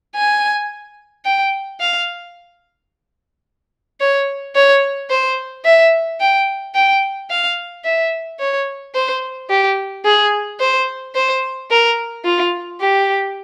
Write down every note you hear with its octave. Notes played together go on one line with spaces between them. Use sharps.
G#5
G5
F5
C#5
C#5
C5
E5
G5
G5
F5
E5
C#5
C5
G4
G#4
C5
C5
A#4
F4
G4